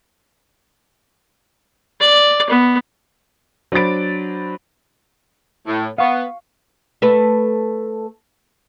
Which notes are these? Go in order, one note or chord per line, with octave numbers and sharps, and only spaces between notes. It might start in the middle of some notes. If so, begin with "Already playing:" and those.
D5
B3
F#3 D4 C5 B5 A6 D7
A2
B3 F5 C#6
A3 A4 B4